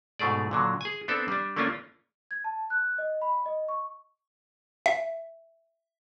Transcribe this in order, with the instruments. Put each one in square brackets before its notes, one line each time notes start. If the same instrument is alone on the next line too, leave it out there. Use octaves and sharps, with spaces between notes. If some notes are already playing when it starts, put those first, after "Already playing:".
[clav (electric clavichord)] G#2 B2 A3 G#4 D5
A#2 D3 F#3
G#4 G#5
B3 C4 D4 A4
G3 D4
A3 A#3 C#4 D4 F4
[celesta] G#6
A5
F#6
D#5
B5
D#5
C#6
[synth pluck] E5